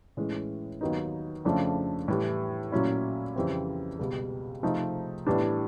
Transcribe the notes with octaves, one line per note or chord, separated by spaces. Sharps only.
A2 E3 G#3 C#4
D#2 D#3 F#3 B3 D#4
F2 C#3 F3 A3 D4
A2 E3 G3
A#2 F#3 A3 C#4 E4
F2 C#3 E3 G3 C4
C#2 B2 G3
C3 F3 A3 C4 D#4
A2 E3 G3 B3 D4